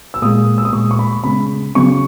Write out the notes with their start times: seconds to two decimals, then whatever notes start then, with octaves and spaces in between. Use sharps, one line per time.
0.14 E6
0.22 A#2 G#3 D#6
0.58 E6
0.65 D#6
0.72 A#2 G#3 C#6
0.91 C#6
0.99 B5
1.24 C#3 G#3 B5
1.75 C#3 F#3 C#6